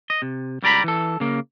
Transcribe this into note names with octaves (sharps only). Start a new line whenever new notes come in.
D#5
C3
C#2 G3 D5 A#5 B5
E3 A4
C#3 A#3